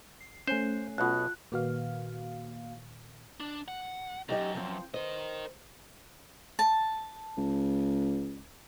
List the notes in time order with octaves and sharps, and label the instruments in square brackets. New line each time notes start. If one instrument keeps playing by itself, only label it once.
[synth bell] C7
[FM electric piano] A3 C#4 [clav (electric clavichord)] C5 [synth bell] G#5 F#6 C7
[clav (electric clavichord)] B1 B2 [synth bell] F4 F#5 A5 [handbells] F#6
[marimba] A#2 D#3 B4 [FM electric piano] A#3 F#4 F5
[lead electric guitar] D4
F#5
[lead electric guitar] F#2 [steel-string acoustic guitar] D#4 G4 D#5
[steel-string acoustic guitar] F3 C4
[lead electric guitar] A#4 D#5 [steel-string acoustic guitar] C5
[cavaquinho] A5
[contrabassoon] C#2